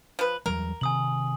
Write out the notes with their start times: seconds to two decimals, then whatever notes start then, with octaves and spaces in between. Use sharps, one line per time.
0.19 F3 B4
0.46 E2 F#3 G3 A#4
0.81 C3 D#3 G#5 D#6 F#7